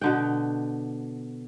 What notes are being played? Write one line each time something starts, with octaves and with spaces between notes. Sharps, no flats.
B2 D3 G5